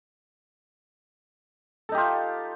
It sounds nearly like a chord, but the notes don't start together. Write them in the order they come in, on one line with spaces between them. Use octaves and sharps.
A4 D#4 G4 F4